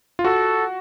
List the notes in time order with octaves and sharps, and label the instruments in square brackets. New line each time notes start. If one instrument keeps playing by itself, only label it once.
[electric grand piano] F4
[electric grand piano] F#4 [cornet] A4